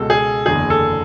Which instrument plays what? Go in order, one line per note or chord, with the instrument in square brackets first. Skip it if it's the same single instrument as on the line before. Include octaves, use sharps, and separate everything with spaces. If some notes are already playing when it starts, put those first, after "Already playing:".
Already playing: [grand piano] C#2 B2 G#3 A4
G#4
F#1 E2 D3 G#4
A4